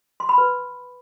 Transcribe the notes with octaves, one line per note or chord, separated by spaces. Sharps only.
C6
B5
B4